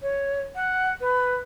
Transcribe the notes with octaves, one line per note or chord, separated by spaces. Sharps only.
C#5
F#5
B4